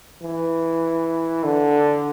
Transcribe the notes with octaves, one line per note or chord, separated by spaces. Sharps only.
E3
D3